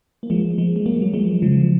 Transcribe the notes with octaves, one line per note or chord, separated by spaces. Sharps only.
A#3
F3 G#3
F3 G#3
G#3
F#3 A#3
F#3
F3 G#3
C#3 F3